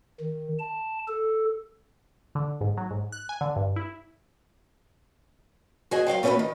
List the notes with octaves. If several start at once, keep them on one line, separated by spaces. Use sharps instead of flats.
D#3
A5
A4
D3
G#2
F#3
G#2
F#6
G#5
D3
G2
E4
F#4 G#4 D#5 G#5
F#3 G#3 F5 G5
A3 B3 C#4 F#4 A4 B4
D#3